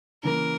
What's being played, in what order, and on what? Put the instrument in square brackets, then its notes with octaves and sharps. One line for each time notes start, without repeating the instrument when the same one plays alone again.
[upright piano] C#3 E3 A#3 [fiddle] A#4